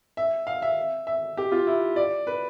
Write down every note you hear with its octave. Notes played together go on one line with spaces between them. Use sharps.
E5
F5
E5
E5
G4
F4
E4
D5
B4